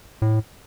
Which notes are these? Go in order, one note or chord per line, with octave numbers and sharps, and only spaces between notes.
A2